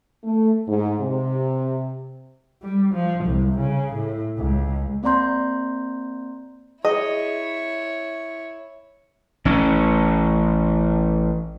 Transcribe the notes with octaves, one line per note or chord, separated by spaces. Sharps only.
A3
G#2
C3
G3
F3
C2
C#3
A2
C#2
A#3 C4 D5 A#5 C6 G6
E4 G#4 C#5 D#5
A1 C#4